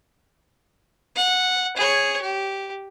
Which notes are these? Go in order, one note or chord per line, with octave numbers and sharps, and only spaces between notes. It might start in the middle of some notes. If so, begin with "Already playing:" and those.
F#5
G#4 C#5
G4